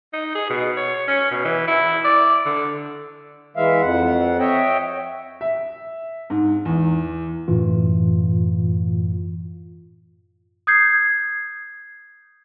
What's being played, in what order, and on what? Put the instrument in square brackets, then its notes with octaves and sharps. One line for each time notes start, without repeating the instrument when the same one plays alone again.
[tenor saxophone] D#4
G#4
B2
C#5
C#4
B2
E3
E4
D5
D3
[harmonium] E3 G#3 E5 F5
F2 F#5
C#5 D#5 E5 G5
[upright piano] E5
G#2
E2
[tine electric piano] F#2 A2 E3 F4
[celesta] D#6 G6 G#6 C7